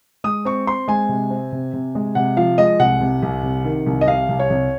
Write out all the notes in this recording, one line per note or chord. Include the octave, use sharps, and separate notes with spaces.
G#3 D#6
C4 C#6
C4 C6
G#3 G#5
C3
C4
C3
C3
G#3
C3 F#5
F3 F5
G#3 D#5
C2 F#5
C3
C2
C3
D#3
C2
D#5
C3 F5
C2
C#5
C2